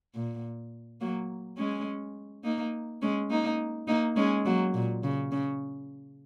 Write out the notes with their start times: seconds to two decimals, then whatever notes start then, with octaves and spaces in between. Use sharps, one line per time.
0.15 A#2
1.01 F#3 A#3
1.58 G#3 C#4
2.44 A#3 D#4
3.02 G#3 C#4
3.30 A#3 D#4
3.88 A#3 D#4
4.16 G#3 C#4
4.46 F#3 A#3
4.74 A#2
5.03 C#3
5.32 C#3